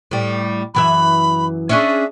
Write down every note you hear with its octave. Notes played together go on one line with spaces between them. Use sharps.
A2 G3
F#2 E3 E5 B5
C#4 D4 G#4 E5